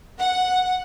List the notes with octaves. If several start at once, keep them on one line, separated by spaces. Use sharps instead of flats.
F#5